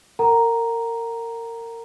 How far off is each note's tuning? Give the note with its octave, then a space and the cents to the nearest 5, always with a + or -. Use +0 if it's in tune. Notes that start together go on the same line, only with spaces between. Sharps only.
A#4 -25 F#5 +35 A#5 +0